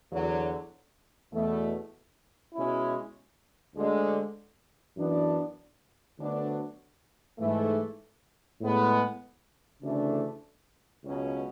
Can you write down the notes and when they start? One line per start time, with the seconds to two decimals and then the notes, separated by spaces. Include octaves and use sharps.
0.12 E2 D3 F#3
1.33 E2 B2 A3
2.54 B2 G#3 C#4 E4
3.75 D2 D3 G#3
4.97 F#2 E3 B3 D4
6.18 D2 D3 F#3 B3 D4
7.39 G#2 E3 A3
8.60 A2 G#3 B3
9.82 D2 C#3 E3 A3 D4
11.03 C#2 B2 F#3 C#4